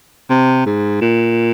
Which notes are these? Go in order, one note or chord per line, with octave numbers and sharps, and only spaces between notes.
C3
G#2
A#2